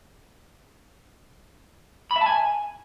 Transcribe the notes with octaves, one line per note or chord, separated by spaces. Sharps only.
B5
E5
A5
G#5